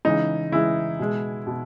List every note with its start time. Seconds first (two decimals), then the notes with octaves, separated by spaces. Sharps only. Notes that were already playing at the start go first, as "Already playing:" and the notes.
0.05 C#3 E3 G#3 D#4
0.51 C#3 E3 G#3 E4
0.99 B2 G#3
1.47 B2